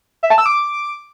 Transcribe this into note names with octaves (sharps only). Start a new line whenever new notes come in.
E5
A5
E6
D6